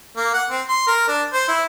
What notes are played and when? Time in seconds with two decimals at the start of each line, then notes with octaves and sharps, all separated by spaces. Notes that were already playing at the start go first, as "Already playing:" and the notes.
0.16 A#3
0.33 F#5
0.50 C4
0.68 C6
0.87 A#4
1.08 D4
1.33 C5
1.48 E4